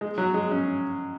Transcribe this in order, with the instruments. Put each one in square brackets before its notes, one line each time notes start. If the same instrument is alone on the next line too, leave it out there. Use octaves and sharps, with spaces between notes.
[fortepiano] G#3
F#3
G#3
C#4